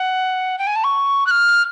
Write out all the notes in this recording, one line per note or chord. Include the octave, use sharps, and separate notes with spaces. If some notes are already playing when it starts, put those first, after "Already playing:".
Already playing: F#5
G5
G#5
A5
C#6
F#6
F6